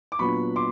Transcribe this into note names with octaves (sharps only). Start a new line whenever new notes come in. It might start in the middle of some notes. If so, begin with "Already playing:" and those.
D6
A#2 F#3 B3 D4 F4 B5 C#6
C6 D6